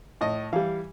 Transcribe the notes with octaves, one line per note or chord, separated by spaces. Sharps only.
A2 D#5
E3 G3 F5